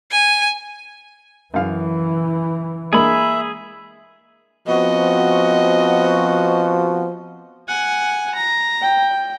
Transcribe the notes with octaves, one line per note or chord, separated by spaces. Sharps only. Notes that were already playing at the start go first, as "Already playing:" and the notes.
G#5
F#2 E3 F5
G#3 A#3 D4 G#4 E5 B5
F3 B3 C4 F#4 D#5
F#5 G#5
A#5
G5